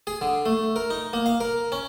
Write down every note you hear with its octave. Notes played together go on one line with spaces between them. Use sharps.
G#4
D3
A3
A#4
D#4
A#3
F5
A#4
C#4